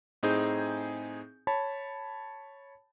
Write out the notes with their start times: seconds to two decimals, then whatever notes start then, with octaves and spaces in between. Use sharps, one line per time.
0.23 A2 C4 D#4 G#4 G#5 G6
1.47 C#5 A5 B5